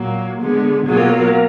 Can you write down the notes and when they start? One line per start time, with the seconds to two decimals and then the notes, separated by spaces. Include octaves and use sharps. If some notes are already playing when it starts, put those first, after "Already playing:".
Already playing: A#2 F#3 A#3
0.39 D3 G#3 B3
0.86 B2 F#3 A#3 F4 G#4
0.97 A#4
1.09 A#4
1.21 A#4